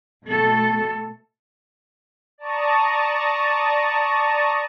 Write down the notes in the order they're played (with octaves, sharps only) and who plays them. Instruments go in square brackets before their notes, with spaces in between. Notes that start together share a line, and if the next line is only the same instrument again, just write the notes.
[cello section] B2 A3 A4
[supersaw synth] D5 A5 A#5 C#6 D#6